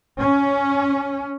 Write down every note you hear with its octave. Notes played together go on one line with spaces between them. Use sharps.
C#4